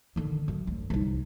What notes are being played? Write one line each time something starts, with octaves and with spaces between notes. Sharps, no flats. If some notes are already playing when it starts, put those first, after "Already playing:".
D3 D#3
F#2
D2
C2 D#4